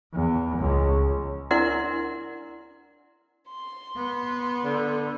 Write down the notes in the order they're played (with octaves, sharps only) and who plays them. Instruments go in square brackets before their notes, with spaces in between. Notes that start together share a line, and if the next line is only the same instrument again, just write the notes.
[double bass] E2
C#2
[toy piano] D4 E4 A#4 D5 F#5 C6
[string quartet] C6
[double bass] B3
[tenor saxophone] D3